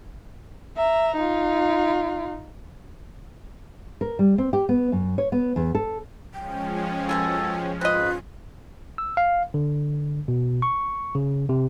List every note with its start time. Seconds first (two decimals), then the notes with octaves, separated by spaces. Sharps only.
0.77 E5 A#5
1.16 D#4 F4
4.01 A#4
4.19 G3
4.38 C4
4.53 G4
4.69 B3
4.92 F#2
5.18 C#5
5.32 B3
5.56 E2
5.75 A4
6.34 F3 G#3 C#4 G5
7.09 B2 D#3 G#4 A4
7.81 G#2 C4 F4 G#4 B4 D#5
8.98 E6
9.17 F5
9.54 D3
10.28 B2
10.62 C#6
11.15 C#3
11.49 C3